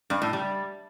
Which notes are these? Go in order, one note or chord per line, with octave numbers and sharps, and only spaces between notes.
G2
A2
G3